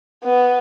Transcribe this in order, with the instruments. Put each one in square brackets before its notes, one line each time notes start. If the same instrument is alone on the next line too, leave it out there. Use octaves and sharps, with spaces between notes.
[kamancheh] B3